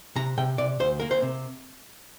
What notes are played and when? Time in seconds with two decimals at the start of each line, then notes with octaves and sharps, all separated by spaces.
0.16 C3 A#5
0.37 C3 G5
0.58 C3 D5
0.80 D2 C5
1.00 A#3 A#4
1.11 C5
1.22 C3